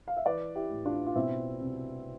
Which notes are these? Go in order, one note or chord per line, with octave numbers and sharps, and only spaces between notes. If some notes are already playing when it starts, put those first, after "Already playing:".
F5
E5
E3 B4 D5
E4 G4
A2
D4 F4
F4
B2 C4 E4
C2